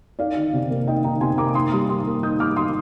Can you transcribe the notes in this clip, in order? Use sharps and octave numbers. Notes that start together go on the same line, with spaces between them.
D#4 D5 F5
D#3
C3
A#3
D#4 D#5 G5
D#3 G5 A#5
C3 G#5 C6
A#3 A#5 D6
D#4 C6 D#6
G3 C6 D#6
D#3 C6 D#6
A#3
D#4 D#6 G6
G3 D6 F6
D#3 C6 D#6